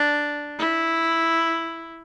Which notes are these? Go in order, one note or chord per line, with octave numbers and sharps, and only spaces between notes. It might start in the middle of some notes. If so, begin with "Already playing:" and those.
Already playing: D4
E4